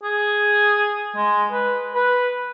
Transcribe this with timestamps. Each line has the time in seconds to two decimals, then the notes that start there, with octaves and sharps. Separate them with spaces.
0.03 G#4
1.16 G#3
1.52 B4
1.95 B4